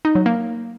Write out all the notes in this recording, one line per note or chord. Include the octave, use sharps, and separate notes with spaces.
D#4
F#3
A#3